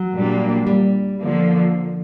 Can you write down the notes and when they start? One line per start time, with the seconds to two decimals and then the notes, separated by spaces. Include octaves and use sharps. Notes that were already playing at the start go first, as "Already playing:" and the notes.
Already playing: F#3
0.14 A#2 G3 A#3 D4
0.67 G3
1.20 D3 F3 A#3